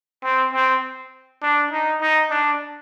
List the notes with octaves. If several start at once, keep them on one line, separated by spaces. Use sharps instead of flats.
C4
C4
D4
D#4
D#4
D4